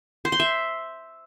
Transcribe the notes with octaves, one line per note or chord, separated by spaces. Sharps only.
C5
C6
E5